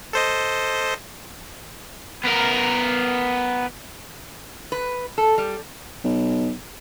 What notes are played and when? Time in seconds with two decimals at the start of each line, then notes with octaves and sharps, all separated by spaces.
0.13 A4 C5 D#5
2.24 B3 A#4
4.72 B4
5.18 A4
5.38 G3
6.04 B1